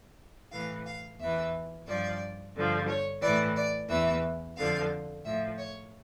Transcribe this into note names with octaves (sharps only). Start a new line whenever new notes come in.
A2 E3 F5
F5
E2 E3 E5
G2 F3 D5
G2 D3 F3
C#5
E3 D5
A2
D5
E2 E3 E5
F2 D3 F3 F5
A2 F3 E5
C#5